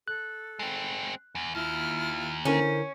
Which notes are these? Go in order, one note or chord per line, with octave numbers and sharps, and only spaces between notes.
A4 F#6
G#3 C4
E2
D#2 E4 F4 F6
D3 C#4 E4 A#4 C5